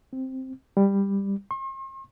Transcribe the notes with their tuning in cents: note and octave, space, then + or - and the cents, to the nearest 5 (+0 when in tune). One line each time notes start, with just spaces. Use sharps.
C4 +0
G3 +15
C6 +45